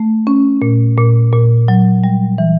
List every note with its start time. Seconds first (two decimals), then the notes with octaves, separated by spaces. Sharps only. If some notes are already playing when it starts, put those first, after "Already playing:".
Already playing: A3
0.27 C#4
0.62 A#2
0.98 A#2
1.33 A#2
1.68 F#3
2.04 G3
2.38 E3